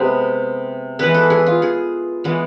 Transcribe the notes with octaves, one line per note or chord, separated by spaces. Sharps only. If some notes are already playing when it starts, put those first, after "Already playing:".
Already playing: C3 G#3 B3 C5
E3 G#3 B3 B4
A4
G#4
F4
G#4
E3 G#3 B3